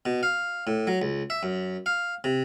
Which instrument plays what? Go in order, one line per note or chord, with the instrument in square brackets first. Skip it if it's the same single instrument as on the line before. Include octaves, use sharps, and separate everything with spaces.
[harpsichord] B2
F5
A2
F#3
C#2
E5
F#2
F5
C3